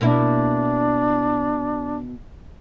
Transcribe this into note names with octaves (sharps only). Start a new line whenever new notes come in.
B2 A#3 D4 E4